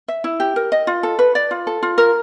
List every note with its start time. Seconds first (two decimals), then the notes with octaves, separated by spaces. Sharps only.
0.08 E5
0.24 E4
0.40 G4
0.56 A#4
0.72 D#5
0.87 F4
1.03 A4
1.19 B4
1.35 D5
1.51 F4
1.67 A4
1.83 F4
1.98 A#4